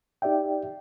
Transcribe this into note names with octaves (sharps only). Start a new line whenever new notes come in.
D#4 G4 D5 E5 G5